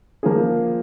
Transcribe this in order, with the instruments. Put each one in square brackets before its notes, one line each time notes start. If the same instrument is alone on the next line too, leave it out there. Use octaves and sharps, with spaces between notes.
[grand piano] F3 A#3 F4 G#4